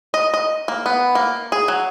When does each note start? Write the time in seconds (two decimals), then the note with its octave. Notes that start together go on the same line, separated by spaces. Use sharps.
0.14 D#5
0.34 D#5
0.68 A#3
0.86 B3
1.15 A#3
1.52 G#4
1.68 F#3